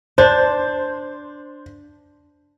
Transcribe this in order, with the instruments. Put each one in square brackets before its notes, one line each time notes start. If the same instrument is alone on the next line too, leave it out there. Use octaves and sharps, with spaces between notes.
[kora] D4 [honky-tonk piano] C5